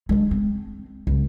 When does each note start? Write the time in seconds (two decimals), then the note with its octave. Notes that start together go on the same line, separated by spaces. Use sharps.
0.09 G#3 D4
0.31 C4
1.07 C#2